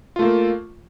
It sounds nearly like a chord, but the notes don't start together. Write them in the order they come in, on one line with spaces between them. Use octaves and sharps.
F4 A3 A#3